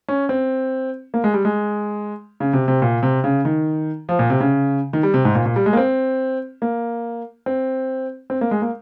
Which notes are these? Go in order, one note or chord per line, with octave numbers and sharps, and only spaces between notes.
C#4
C4
A#3
G#3
G3
G#3
C#3
C3
C3
A#2
C3
C#3
D#3
F3
A#2
C3
C#3
D#3
G3
C3
G#2
A#2
A#2
G3
G#3
A#3
C4
A#3
C4
C4
A#3
G#3
A#3